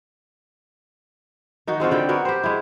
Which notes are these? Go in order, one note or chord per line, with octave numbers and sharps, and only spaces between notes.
D#3 D#4 F#4
G#3 C4 F4 F#4
D3 G3 F#4 G5
B3 F#4 A#4 C#5
G4 C5
G#3 E4